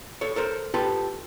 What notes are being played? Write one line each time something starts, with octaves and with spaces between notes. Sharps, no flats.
A4 C#5
A4 A#4 C5
F4 G4 A4 B4